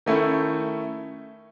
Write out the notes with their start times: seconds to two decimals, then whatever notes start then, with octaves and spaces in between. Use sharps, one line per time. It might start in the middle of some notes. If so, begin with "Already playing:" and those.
0.06 D#3 A3 C#4 E4